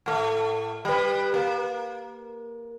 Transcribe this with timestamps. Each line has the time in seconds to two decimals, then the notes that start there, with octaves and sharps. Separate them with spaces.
0.06 A2 A3
0.85 G3 B4
1.34 A#3